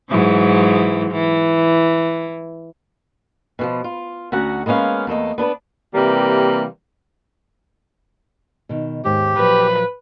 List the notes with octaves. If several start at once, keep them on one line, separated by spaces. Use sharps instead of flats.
G#2 E3 F#3
E3
B2 E3 F3
F4
D2 C#4 F#4 F#5 A#5
G#3 A#3 B3 C#4 F5
E2 A3 A#3 D#5
B3 D4 E4 B4
C3 E3 G3 A#3
B2 D#3
D#2 G#2 D#3 G4
A#2 F3 F#3 B4